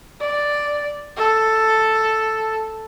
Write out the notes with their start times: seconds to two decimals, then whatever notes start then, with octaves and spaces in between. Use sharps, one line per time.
0.20 D5
1.17 A4